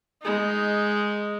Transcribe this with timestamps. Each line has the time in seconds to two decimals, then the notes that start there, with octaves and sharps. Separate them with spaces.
0.22 G#3 D#4